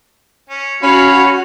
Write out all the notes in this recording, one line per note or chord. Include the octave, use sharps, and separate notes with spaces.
C#4
C#4 F#4 C#5 F5 B5